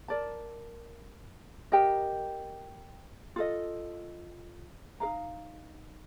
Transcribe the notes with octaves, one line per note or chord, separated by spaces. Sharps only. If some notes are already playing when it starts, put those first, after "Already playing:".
A#4 D5 A5
G4 A#4 D#5 G5
F4 A4 D#5
D#4 A#4 F5 A#5